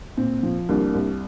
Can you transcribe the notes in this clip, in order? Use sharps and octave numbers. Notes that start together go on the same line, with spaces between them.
A#2 C4
F3
C2 A#3 D4
C2